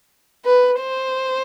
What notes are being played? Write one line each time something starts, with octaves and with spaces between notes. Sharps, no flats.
B4
C5